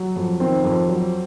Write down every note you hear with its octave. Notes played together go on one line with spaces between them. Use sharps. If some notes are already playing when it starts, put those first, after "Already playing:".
Already playing: F#3
F2
D#3 C4
F2
F#3